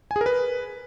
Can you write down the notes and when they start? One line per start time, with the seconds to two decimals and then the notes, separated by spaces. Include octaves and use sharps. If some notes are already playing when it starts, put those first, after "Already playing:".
0.11 G#5
0.16 G#4
0.21 A#4
0.26 B4